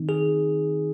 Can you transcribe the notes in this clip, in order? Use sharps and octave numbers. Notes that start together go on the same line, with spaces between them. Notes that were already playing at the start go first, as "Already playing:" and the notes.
Already playing: D#3 C4 D#4
G#4